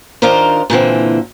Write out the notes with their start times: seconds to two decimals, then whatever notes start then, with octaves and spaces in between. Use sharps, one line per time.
0.22 D#3 D4 F4 A#4 C5
0.70 A#2 D3 E3 C4